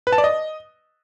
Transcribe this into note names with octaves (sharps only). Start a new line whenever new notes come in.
B4
A5
D5
D#5